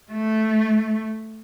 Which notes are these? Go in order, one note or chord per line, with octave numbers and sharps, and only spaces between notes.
A3